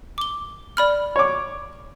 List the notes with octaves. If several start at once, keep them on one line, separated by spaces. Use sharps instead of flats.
D6 G7
D5 B5 F6
C#5 D6